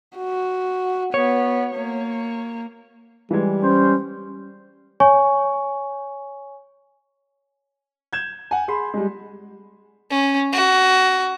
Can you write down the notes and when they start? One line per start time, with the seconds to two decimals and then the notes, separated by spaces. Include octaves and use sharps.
0.18 F#4
1.14 B3 C#5
1.76 A#3
3.31 E3 G3 G#3
3.62 C#4 C5
5.00 C#5 G#5 C#6
8.13 G6 G#6 E7
8.51 F#5 G#5
8.68 G#4 B5 C6
8.94 G3 G#3
10.11 C#4
10.52 F#4